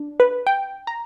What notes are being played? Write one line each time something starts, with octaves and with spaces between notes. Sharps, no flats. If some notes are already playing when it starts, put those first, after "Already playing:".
Already playing: D4
B4
G5
A#5